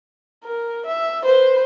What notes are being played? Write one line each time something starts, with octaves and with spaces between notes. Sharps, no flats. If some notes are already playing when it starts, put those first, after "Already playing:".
A#4
E5
B4 C5